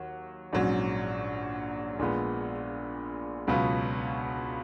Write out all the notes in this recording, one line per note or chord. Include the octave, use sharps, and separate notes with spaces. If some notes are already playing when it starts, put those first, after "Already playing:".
Already playing: D#2 F#3
A#1 G#2 F#3 C#4
A#1 A#2 G#3 B3
C#2 B2 F#3 B3 F4